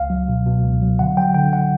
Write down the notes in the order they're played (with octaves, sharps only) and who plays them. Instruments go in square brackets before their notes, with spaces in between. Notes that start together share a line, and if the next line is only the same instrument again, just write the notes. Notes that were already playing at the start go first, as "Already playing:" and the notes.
Already playing: [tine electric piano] C#2 F5
F#3
B2
B2
C#2
F#3
D3 F#5
F#3 G5
D3 G5
F#5